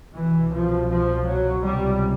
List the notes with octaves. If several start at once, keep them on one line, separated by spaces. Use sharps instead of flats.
C2 B2 E3
F3
F3
F#3
C#2 C3 G3